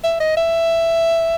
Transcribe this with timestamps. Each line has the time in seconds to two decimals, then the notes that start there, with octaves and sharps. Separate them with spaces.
0.04 E5
0.20 D#5
0.37 E5